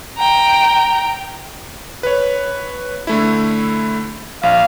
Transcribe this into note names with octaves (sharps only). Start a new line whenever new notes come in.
G5 A#5
B4 C#5
D3 A3 E4
A#1 F5